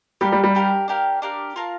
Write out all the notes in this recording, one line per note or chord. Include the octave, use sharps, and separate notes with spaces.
G3 D4 G4 A#4 F5
G3
G3
D4 G4 A#4 F5
D4 G4 A#4 F5
D4 G4 A#4 F5
F4 A#4 F5 A5